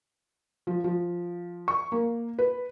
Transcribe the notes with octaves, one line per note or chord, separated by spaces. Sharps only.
F3
F3
C#6
A#3
B4